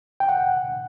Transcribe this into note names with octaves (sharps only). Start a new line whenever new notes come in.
G5
F#5